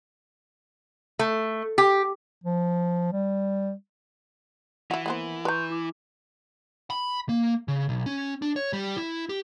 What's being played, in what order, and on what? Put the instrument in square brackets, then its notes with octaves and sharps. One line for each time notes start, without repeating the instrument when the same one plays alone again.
[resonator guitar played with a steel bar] A3
G4
[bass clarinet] F3
G3
[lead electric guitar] E3 [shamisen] E4 F#4
[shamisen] A#3 B3 C5 [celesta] A#4 F#5
[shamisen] B4 A#5 [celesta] C6 C#6 G6
[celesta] E4 D6
[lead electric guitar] B5
A#3
C#3
B1
C#4
D4
C#5
G3
E4
G4